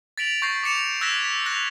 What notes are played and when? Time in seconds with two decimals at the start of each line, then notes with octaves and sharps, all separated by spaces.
0.18 A6 B6 D7 F7 F#7
0.42 C#6 G6 A6 A#6 C7
0.63 D6 B6 C#7 E7 F7
1.01 E6 F#6 G#6 A#6 B6 E7
1.24 B6
1.46 F#6 A#6 F7